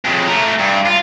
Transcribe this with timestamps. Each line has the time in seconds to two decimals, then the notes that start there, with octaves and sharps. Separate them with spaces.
0.05 F2 C#3
0.28 A3 A#4
0.59 G2
0.86 F4